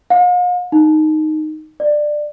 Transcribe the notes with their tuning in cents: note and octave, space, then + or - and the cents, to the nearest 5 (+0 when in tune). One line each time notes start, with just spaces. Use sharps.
F5 +45
D#4 -5
D5 +15